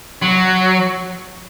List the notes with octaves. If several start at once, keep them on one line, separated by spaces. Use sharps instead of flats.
F#3